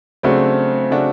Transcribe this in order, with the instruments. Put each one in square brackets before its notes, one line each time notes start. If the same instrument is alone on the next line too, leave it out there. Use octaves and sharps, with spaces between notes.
[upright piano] C#3 F#3 A3 D4 F#4 [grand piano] C4
[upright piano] C#3 F#3 A3 D4 F#4